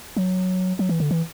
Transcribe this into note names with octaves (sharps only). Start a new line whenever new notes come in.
F#3
F#3
E3
D3
E3